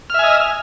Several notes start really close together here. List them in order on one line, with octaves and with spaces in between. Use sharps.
F6 E5 G#5 D#5